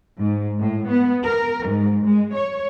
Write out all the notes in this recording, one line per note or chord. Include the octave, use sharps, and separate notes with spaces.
G#2
A2
B3
A#4
G#2
G#3
C#5